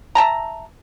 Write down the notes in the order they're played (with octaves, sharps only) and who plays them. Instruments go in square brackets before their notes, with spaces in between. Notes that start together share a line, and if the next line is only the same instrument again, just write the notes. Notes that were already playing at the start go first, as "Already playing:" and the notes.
[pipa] E5 G5 A5 A#5